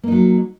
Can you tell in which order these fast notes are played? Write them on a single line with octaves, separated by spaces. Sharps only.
A#3 D#4 F#3